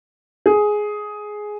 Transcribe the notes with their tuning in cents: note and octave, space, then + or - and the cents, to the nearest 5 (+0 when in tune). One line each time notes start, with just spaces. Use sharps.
G#4 +10